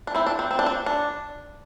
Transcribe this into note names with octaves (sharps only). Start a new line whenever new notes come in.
D4
C4 E4
D4
C4
C4
D4
C4
D4